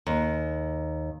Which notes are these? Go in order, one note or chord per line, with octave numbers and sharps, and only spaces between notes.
D#2